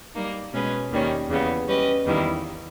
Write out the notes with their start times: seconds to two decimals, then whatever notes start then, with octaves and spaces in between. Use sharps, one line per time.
0.14 G3 A#3 D#4
0.53 B2 G#3 C#4 G#4 B4
0.91 D#2 D#3 G3 C#4
1.29 E2 C#3 G3 B3
1.67 G3 C#4 G4 B4 D#5
2.06 E2 D#3 G3 A#3 E4